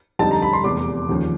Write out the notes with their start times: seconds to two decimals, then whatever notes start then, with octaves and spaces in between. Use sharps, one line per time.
0.19 F2 D3 G3 C4 D#4 A5
0.31 A#5
0.42 B5
0.53 C6
0.64 F1 E2 C3 D6
1.09 D#2 C#3 F3